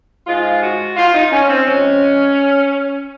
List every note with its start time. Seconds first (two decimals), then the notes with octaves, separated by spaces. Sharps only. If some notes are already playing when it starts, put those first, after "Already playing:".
0.27 G#2 F3 G#3 F4
0.62 F#4
0.96 F4
1.14 D#4
1.31 C#4
1.49 C4
1.66 F2 C#3 G#3 C#4